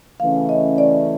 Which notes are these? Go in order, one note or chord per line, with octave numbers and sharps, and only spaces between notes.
C#3 E3 A3 C#4 F5
D#5
D5